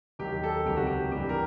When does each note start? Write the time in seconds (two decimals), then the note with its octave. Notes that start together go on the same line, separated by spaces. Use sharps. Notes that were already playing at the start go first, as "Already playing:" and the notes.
0.19 D#2 D#3 F#3 G4
0.43 A4
0.65 C#2 C3 D#3 F#3 G4
0.76 F#4
0.87 G4
1.12 G2 E3 G4
1.29 A#4